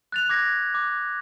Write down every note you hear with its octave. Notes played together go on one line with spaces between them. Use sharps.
F#6 A6 F7
D6 G#6 A#6
D6